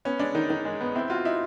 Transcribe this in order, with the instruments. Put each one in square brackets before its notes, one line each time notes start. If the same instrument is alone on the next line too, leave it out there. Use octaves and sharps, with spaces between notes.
[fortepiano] B3 [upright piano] C#4
[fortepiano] G#3 [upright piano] D4
[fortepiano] D#3 [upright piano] D#4
[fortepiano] D#3 [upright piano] D#4
[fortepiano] G#3
B3
[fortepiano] C4 [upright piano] E4
[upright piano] F4 [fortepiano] F#4
[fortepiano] D#4 [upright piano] E4